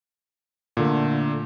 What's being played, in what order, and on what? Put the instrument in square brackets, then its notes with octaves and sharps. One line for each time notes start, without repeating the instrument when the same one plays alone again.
[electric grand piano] A#2 D3 A3